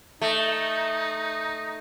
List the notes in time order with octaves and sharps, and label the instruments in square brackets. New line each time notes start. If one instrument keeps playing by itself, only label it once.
[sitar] A3 [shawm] D#4